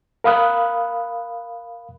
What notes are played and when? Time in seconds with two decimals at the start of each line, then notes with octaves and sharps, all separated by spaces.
0.24 A#4 F5 B5 D#6 F#6